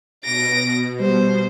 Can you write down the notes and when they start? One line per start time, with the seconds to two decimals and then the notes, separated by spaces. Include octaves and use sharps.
0.24 B2 A#6 D7
1.00 G3 C5